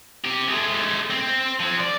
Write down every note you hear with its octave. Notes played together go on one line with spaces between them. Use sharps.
C3 G4
G#3 A3
C4
F3 C4
D5